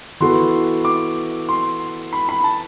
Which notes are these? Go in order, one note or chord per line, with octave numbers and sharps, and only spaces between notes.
E3 B3 F#4 A4 C6
D6
C6
B5
B5
A5